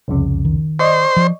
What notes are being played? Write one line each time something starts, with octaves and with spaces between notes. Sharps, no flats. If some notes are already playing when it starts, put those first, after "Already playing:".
C2 F2 C#3
D#3
C5 D5 D#5 C#6
F3